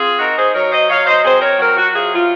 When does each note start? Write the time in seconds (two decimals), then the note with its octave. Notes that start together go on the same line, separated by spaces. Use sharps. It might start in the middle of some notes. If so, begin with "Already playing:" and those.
Already playing: C4 F4 G#4
0.19 D#4 F#4 A#4
0.37 G#4 C5
0.54 F#3 A#4 C#5
0.72 C5 D#5
0.89 F#3 C#5 F5
1.07 C5 D#5
1.25 C4 G#4 C5
1.41 A#4 C#5
1.59 F#3 F#4 A#4
1.77 F#4
1.94 C3 F4 G#4
2.13 F4